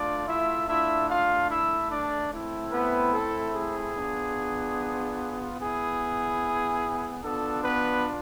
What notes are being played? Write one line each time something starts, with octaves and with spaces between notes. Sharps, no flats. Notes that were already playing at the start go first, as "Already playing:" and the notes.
Already playing: A3 D4 F4 D5
E4 E5
A3 D4 E4 F4 E5
F4 F5
E4 E5
D4 D5
A3 C4 E4
B3 B4
A4
G#4
B3 D4 F4
B3 E4 G#4
B3 D4 F4 A4
B3 B4